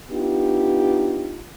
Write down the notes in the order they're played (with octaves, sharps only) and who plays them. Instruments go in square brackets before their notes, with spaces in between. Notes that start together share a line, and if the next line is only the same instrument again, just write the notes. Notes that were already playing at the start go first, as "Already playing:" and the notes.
[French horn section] B3 D4 D#4 F4 G4